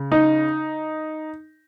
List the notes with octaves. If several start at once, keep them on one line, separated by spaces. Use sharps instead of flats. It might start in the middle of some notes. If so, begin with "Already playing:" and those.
Already playing: C#3
D#4